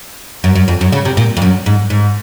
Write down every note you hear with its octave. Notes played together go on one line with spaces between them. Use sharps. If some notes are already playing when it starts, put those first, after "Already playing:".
F#2
F#2
F2
F#2
C#3
C3
A#2
F2
F#2
G#2
G#2